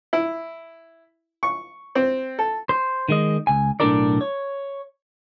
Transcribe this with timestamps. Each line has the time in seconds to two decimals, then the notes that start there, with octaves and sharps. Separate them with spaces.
0.13 E4
1.43 C#6
1.95 C4
2.39 A4
2.69 C5
3.09 D#3 G#3 D#5
3.47 C#2 G#5
3.80 B1 A2 D4 A4 A#4 D5
4.21 C#5